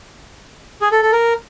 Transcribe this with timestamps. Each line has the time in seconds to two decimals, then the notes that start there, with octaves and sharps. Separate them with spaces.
0.81 G#4
0.92 A4
1.02 A4
1.12 A#4